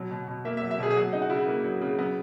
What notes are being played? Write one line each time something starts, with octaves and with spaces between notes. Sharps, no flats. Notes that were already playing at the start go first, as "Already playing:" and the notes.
Already playing: B2 F#3
B2
B2
A#3 E5
F#3 E5
E5
B2 G#4
G#4
F#3 F#4
C#3 D#4
F#4
C#3 E4
A#3
F#3
C#3
F#3 B3